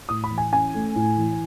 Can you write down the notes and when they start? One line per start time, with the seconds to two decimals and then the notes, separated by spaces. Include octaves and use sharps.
0.09 A2 D#6
0.24 B5
0.31 E3
0.38 G#5
0.52 C#4 G#5
0.74 A3
0.96 A2
1.17 E3